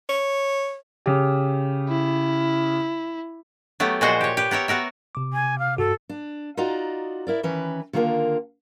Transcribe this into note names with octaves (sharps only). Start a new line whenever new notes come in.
C#5
C#3 G4
E4
F#3 A3 B3 G4
A#2 F3 G#3 F#4 C5 F#5
G4 C#5
G4 B4
B3 A#4 C#5 E5
B3 F#4 A#4 E5
C3 D6
G#5
F5
G2 F#4 A4
D4
D#4 F4 F#4 D5 D#5 A#5
E4 A#4 D5
D#3 E3 C#4 B4
D3 D#3 A#3 F4 A#4